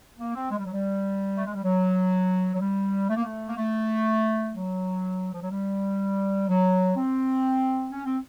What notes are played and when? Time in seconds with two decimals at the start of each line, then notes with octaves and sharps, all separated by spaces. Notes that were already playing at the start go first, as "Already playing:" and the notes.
0.18 A#3
0.35 C4
0.51 G#3
0.58 G3
0.65 F#3
0.72 G3
1.37 A3
1.46 G#3
1.54 G3
1.64 F#3
2.55 F#3
2.60 G3
3.09 A3
3.16 A#3
3.24 A3
3.47 A#3
3.57 A3
4.54 F#3
5.34 F3
5.42 F#3
5.50 G3
6.48 F#3
6.96 C4
7.92 C#4
8.05 C4